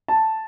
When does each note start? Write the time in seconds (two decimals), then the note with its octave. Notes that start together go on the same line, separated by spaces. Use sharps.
0.08 A5